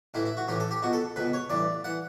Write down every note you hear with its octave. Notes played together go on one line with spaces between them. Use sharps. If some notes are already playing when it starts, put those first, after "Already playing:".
A1 A2 E3 E4
E4
F#4
A1 A2 E3 G4
A4
G4
C#2 B2 F#4
A4
C#2 B2 B4
C#5
A1 G2 E3 D5
E3 F#5